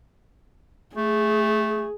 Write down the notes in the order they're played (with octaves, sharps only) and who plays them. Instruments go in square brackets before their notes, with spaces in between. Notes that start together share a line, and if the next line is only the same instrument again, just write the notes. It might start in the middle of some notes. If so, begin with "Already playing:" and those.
[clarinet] A3 [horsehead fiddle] G#4